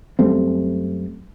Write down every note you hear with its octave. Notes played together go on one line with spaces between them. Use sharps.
F#2 G3 A3 C4